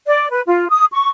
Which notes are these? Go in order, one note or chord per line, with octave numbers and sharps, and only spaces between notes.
D5
B4
F4
D#6
C#6